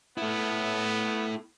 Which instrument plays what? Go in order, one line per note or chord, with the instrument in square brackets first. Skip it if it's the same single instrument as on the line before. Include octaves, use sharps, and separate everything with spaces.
[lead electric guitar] A3 E4 [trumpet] B3